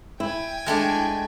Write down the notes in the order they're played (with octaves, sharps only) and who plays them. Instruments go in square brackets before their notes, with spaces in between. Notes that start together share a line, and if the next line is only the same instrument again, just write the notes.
[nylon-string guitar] E4 [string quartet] G5 G#5
[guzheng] G#3 A3 D4